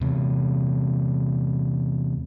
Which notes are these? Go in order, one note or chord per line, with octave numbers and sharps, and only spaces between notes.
E2 C3